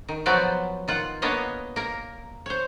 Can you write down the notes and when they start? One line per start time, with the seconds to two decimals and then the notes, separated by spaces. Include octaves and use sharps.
0.09 D#3
0.26 F3 F#3 B3 F#4 C5 D5
0.88 D#3 F4 F#5
1.22 A#3 B3 D4 C#5 D#5 F5
1.76 A#3 A#4 A#5
2.46 C5 C#5